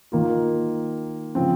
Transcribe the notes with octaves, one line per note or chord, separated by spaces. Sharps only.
D#3 A#3 F4
C#3 F3 C4